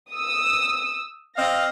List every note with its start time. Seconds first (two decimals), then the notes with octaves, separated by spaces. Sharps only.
0.10 D#6 E6
1.37 C4 D#5 F5 A#6